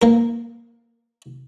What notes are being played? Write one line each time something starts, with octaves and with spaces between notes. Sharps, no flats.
A#3 A#4